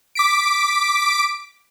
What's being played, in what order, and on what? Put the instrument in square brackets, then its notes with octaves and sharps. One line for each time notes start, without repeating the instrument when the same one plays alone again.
[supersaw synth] D6 B6 D7